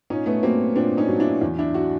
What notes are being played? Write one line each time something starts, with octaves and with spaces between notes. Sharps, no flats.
A#2 C#4 D#4
A3 B3
F#3 A#3 C4
A#2 C4 D4
C#4 D#4
F#3
D4 E4
E2
D4 E4
E4 F#4